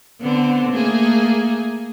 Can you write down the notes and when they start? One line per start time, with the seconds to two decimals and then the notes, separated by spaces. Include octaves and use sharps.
0.21 D3 B3 C4
0.72 A3 A#3 G#4